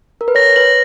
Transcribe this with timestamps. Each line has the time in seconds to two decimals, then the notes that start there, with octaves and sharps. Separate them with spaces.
0.21 A#4
0.28 B4
0.35 C#5 A#6
0.56 B4 F#7